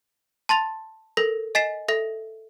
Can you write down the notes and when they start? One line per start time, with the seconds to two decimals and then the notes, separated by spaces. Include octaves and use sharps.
0.49 A5 C6 A6 F7
1.17 A4 A#4 A#6
1.55 D#5 G#5 A6 B6 C7 E7
1.88 A4 E5 A#6